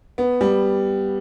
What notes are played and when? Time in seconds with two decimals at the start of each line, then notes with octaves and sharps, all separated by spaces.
0.18 B3
0.41 G3